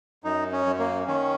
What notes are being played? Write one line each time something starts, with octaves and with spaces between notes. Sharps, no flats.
F#2 D#4
C#4
F#2
A#3
D#3 C#4